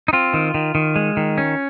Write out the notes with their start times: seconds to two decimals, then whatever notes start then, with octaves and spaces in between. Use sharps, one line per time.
0.08 D#4
0.13 C4 F4
0.34 D#3
0.54 D#3
0.75 D#3
0.96 G#3
1.17 D#3
1.38 C#4